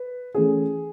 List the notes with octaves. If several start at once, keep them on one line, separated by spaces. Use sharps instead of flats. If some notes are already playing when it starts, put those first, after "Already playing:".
Already playing: B4
E3 A3 C#4 G#4